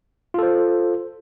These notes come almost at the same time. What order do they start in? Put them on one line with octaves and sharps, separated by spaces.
F4 A4 C5